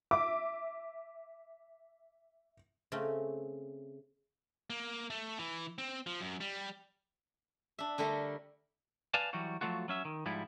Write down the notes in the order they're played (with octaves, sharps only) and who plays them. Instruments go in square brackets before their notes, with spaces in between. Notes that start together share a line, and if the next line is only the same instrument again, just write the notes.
[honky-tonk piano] E5 D6
[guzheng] C#3 A3 C4 C#4
[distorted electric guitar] A#3
A3
E3
C4
F3
F#2
G3
[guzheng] D4 E5
D3 G3 A3 A#4
[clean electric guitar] B4 D5 F5 G#5 A5
E3 F#3 G3 F#4
F3 F#3 A3 F4 F#4
F#3 C#4 E5
D#3
G#2 F3 G3 E4